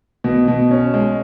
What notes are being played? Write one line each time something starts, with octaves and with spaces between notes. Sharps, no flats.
B2
B2
C#4
G#3